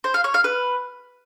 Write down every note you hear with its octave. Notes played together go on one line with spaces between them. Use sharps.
C5
F5
C#5
F5
B4